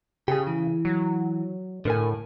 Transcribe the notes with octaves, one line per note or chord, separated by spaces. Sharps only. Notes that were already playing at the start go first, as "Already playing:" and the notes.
C#3 G4 G#4
E3
F#3
A2 D3 A#4 G#5